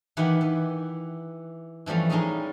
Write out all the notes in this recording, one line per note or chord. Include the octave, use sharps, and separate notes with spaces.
D#3 E3 E4 G4 F#5 B5
E3
E3 F3 G3 A3 C#4
G3 G#3 C#4 D#4 A#4 D#5